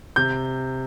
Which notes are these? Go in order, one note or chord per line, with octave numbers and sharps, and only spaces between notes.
C3 G6